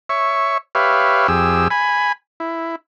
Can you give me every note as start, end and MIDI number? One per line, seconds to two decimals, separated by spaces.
0.09 0.58 73
0.09 0.58 76
0.09 0.58 85
0.75 1.27 67
0.75 1.27 71
0.75 1.27 73
0.75 1.27 76
0.75 1.27 77
1.28 1.68 41
1.28 1.68 67
1.28 1.68 68
1.28 1.68 88
1.70 2.12 80
1.70 2.12 83
2.40 2.76 64